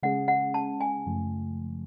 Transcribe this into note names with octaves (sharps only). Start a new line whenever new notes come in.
C#3 G#3 C#4 G#4 F#5
F#5
A5
G#5
F#2 C#3 F3 A3